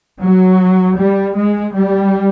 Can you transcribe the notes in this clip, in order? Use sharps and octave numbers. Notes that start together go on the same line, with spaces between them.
F#3
G3
G#3
G3